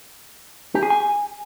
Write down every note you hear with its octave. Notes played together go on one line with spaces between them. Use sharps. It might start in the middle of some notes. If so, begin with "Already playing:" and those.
G4
G#4
G#5